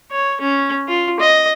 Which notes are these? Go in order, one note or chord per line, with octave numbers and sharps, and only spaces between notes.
C#5
C#4
F4
D#5